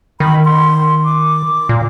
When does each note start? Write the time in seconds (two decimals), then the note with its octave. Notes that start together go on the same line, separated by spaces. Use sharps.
0.20 D#3 B5
0.45 C6
1.05 D6
1.69 A#2